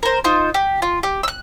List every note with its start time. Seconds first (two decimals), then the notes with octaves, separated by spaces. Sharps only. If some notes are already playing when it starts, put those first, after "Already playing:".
0.03 A#4 C5
0.24 D#4 F4 C5
0.54 G4
0.82 F4
1.03 G4
1.23 E6 F#6